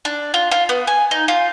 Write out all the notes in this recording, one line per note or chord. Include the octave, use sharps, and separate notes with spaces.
D4
F4
F4
B3
G#5
D#4
F4